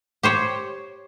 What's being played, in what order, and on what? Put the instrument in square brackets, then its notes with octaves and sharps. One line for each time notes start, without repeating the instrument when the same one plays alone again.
[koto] G4 C5 C#5